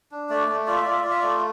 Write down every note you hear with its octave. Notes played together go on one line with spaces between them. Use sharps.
D4
A3 D5
A3
F4 D5
E5
F4 D5
E5
F4 D5
E5
A3 D5